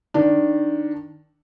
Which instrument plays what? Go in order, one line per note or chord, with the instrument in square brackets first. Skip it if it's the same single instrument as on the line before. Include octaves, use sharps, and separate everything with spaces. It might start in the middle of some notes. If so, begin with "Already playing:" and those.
[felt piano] D#3 D4